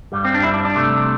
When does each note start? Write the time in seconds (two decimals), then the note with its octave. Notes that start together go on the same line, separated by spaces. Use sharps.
0.12 G2 G3
0.25 C4
0.34 D4
0.43 E4
0.54 D4
0.65 D4
0.76 C2 C3 A3